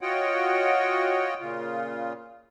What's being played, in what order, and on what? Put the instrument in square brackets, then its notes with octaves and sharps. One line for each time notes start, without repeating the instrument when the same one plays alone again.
[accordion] F4 F#4 C#5 D#5 F#5 G5
A#2 C#3 F4